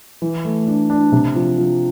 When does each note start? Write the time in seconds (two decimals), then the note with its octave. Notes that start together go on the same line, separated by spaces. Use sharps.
0.22 E3
0.45 A3
0.67 D4
0.90 D4
1.12 C3
1.36 F3
1.58 F3